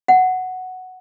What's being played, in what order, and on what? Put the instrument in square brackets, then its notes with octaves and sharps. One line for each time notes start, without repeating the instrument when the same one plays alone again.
[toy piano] F#5